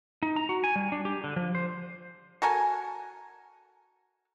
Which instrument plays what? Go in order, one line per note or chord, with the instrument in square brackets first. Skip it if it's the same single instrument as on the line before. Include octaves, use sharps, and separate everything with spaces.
[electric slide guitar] D#4
A#5
F#4
G#5
G3
D4
G4
D3
F3
C5
[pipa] F#4 A4 A#4 G#5